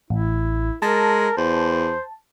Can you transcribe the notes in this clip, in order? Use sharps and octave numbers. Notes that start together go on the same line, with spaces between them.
A1 E4
G#3 A#4 A5
E2 C5